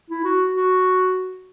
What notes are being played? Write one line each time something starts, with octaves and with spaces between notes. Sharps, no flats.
E4
F#4
F#4